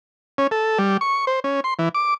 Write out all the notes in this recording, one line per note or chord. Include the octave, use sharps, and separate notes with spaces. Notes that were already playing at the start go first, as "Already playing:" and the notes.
C#4
A4
G3
C#6
C5
C#4
C6
E3
D6